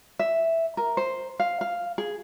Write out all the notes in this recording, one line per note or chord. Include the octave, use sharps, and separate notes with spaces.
E5
A#4
C5
F5
F5
G#4